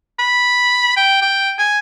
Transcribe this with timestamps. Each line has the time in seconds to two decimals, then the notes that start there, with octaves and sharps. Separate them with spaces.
0.19 B5
0.97 G5
1.22 G5
1.59 G#5